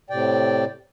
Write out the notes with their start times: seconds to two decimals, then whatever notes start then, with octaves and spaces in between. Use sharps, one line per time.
0.10 A2 C3 D5 G5